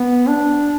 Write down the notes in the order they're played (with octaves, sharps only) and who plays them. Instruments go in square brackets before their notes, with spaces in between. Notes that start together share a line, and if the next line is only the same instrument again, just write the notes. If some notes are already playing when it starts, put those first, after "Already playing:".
Already playing: [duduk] B3
D4